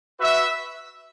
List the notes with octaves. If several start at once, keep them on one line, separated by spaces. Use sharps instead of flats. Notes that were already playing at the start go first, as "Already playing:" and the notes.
F#4 B4 E5